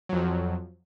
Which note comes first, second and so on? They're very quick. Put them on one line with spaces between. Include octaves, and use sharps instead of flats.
F#3 F2 F3